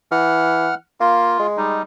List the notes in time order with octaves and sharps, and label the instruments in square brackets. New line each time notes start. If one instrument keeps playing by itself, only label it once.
[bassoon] E3 [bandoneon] F#5 F6
[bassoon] A#3 [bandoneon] F4
[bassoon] G#3
[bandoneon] G3 D#4